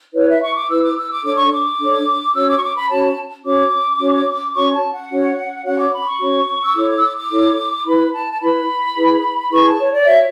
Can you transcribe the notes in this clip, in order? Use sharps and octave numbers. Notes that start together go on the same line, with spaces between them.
E4 B4 C#5
E5
C#6
D6
E4 B4 E6
D6
E6
D6
D4 A4 C#5 D6
C#6
D6
D4 A4 C#5
C#4 F#4 C#5 E6
D6
C#6
D6
B5
C#4 F#4 C#5 A5
C#4 F#4 C#5 D6
C#4 F#4 C#5
C#4 F#4 C#5 C#6
A5
F#5
C#4 F#4 C#5
C#4 F#4 C#5 F#5
D6
B5
D6
C#6
C#4 F#4 C#5
E6
E4 A4 C#5 D6
D6
E6
D6
D6
E4 A4 C#5
E4 B4 B5
A5
A5
E4 B4 B5
E4 G#4 B4
E4 G#4 B4 C#6
A5
C#5
D5
F#4 C#5 E5